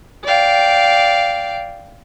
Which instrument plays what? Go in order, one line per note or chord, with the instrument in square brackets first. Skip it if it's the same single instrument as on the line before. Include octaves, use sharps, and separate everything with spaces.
[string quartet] D5 F5 G5